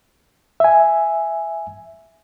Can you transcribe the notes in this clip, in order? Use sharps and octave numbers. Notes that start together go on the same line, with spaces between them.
E5 G#5